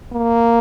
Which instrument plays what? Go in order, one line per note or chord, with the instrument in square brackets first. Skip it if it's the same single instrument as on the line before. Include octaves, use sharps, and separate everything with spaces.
[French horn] A#3